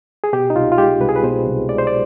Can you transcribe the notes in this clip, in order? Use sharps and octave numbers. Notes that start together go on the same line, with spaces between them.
G#4
B2 G4
D#4
C2 F4
F4
G#3 G4
C2 B4
G#4
B4
B2 C5
C2
G#3 D5
C5
D5